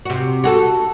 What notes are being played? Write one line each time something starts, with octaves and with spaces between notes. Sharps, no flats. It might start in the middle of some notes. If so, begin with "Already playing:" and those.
C3 F#4
F#4 G#4 A4